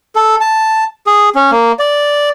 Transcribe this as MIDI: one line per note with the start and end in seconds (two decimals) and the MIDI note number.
0.16 0.36 69
0.41 0.84 81
1.07 1.29 68
1.35 1.51 61
1.51 1.72 58
1.79 2.29 74